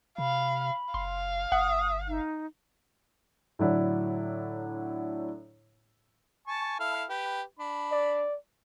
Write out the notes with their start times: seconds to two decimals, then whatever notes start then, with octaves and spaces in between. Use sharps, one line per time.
0.18 C3 F5 B5
0.94 F#1 F5 C6
1.52 G1 F#5 D#6
2.08 D#4
3.59 A2 D3 F#3 D4 E4 F#4
6.47 G#5 A5 C#6
6.79 E4 A4 F5
7.09 G4 B4
7.59 D4 B5
7.92 D5